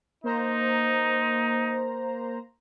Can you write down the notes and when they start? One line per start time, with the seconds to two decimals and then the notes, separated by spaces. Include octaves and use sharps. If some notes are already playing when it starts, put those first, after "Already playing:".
0.24 A#3 D#4 C5 A#5